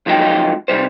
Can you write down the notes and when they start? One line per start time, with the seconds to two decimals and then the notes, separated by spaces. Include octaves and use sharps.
0.06 C#2 F3 F#3 D#4 G#4 G5
0.68 C3 D#3 G3 C5